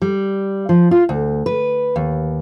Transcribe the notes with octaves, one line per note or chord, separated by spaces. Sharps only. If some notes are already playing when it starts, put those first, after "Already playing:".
G3
F3
F4
D2
B4
D#2